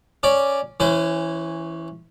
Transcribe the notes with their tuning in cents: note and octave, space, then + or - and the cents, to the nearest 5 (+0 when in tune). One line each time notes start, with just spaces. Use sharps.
C#4 +0 D5 +0
E3 +0 C#4 -10 C5 -45